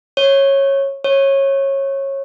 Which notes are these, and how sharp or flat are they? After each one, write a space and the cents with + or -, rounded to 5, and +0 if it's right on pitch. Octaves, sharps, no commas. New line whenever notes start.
C#5 -15
C#5 -20